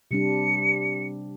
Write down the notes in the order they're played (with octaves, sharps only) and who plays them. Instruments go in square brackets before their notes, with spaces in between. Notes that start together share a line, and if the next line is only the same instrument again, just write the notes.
[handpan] C3 G3 D4 [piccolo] C#7